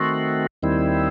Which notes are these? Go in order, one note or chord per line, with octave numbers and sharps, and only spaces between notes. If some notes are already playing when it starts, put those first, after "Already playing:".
Already playing: D#3 A3 C4 F#4
D#2 D#3 G3 C4 E4